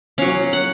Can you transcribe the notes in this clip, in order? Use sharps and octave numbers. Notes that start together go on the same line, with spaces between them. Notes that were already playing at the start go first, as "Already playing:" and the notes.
F#3 C#4 F5
F#5